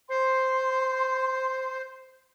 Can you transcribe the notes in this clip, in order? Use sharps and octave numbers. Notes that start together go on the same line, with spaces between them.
C5 C6